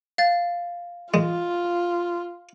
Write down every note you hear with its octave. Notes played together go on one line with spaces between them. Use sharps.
F5 A6
G#3 F4